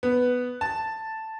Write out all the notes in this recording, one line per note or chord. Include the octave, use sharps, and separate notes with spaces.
B3
A5